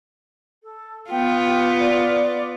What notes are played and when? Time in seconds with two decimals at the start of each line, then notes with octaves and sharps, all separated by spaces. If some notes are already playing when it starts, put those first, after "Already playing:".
0.63 A4
1.10 B3 F4 G5
1.46 G4
1.78 D5